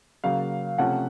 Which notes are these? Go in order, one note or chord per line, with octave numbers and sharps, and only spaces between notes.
C#3 F#3 A#3 F5
C3 F3 A3 C#4 F#5